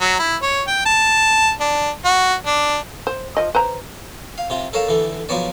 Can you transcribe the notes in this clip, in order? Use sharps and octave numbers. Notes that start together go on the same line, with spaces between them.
F#3
E4
C#5
G5
A5
D4
F#4
D4
C5
F3 D#5
B4 C5 A#5
F5
C3 F4
A4 A#4 C#5 F5 A5
D3 E3 A4
F3 F#3 B3 C#5 D5